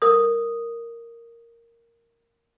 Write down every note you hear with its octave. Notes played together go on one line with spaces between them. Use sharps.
A#4 D#6